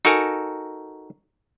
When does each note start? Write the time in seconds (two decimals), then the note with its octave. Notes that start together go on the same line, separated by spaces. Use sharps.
0.05 D#4 F#4 A4 A#4 G#5